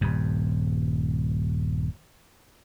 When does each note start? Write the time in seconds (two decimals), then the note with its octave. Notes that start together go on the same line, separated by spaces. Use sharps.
0.01 D#1 G2